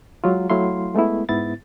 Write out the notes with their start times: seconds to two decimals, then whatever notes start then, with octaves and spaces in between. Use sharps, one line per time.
0.24 F#3 G#3 F4
0.50 F#3 A3 E4 F5 C6
0.95 G#3 A3 B3 E4
1.29 G#2 B3 E4 A6